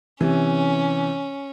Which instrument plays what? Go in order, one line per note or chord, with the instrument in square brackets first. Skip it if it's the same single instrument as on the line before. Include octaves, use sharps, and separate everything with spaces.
[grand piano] C3 E3 [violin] C#4